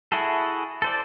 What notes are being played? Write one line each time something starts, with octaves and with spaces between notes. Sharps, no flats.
E4 F#4 G#4 A4
A4 C5 D5